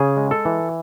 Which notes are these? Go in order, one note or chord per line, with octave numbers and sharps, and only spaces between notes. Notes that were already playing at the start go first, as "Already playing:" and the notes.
Already playing: C#3 G#4
G#3
A4
E3